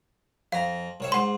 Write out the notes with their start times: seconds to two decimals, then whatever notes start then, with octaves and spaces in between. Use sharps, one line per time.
0.52 F2 F5 A#5
1.00 C2 C#5 E5
1.12 G#2 F#5 C6